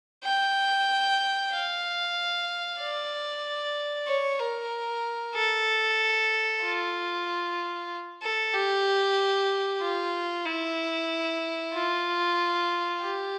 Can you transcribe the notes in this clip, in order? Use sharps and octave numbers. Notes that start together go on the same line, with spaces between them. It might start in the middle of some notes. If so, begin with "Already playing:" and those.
G5
F5
D5
C#5
A#4
A4
F4
A4
G4
F4
E4
F4
G4